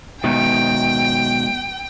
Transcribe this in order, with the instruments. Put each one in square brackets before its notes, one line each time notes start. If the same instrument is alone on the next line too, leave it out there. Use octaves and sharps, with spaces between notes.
[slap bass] B2 D#3 [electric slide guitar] F#3 G#3 B3 [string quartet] G5